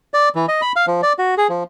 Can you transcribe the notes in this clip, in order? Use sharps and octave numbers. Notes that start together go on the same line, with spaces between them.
D5
E3
D#5
B5
F5
F3
D5
F#4
G#4
F3